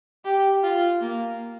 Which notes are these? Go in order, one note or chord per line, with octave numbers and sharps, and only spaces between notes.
G4
F4
A#3